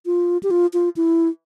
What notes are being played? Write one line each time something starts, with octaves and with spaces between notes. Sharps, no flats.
F4
G4
F4
F4
E4